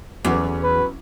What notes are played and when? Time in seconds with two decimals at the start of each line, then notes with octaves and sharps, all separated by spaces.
0.25 E2 F#3 B3 C#4
0.64 B4